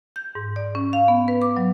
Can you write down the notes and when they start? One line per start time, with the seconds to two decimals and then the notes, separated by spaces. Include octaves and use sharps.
0.16 G6
0.35 G#2
0.56 D5
0.75 C#4
0.93 F5
1.08 B3
1.28 B4
1.42 D6
1.57 F#3